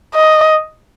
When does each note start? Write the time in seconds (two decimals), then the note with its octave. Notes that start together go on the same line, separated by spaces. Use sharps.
0.15 D#5